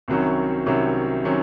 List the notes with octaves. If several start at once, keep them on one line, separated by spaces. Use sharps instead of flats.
C2 C3 D#3 F#3 C#4
C2 C3 D#3 F#3 C#4
C3 D#3 F#3 C#4